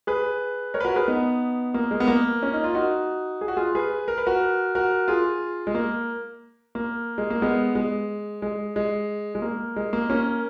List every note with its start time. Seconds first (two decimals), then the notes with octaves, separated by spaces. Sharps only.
0.07 G#4 B4
0.74 A#4 C#5
0.80 B4
0.85 F#4 A#4
0.96 G#4 B4
1.08 B3 D#4
1.74 A#3
1.91 G#3
2.00 B3
2.07 A#3
2.43 C#4
2.54 D#4
2.64 F4
2.75 D#4 F#4
3.41 G#4
3.48 F#4
3.57 F4 G#4
3.75 G#4 B4
4.08 A#4
4.18 B4
4.27 F#4 A#4
4.75 F#4 A#4
5.08 F4 G#4
5.67 G#3
5.74 A#3
6.75 A#3
7.18 G#3
7.30 A#3
7.42 G#3 B3
7.75 G#3
8.42 G#3
8.76 G#3
9.35 G#3
9.42 A#3
9.76 G#3
9.93 A#3
10.10 A#3 C#4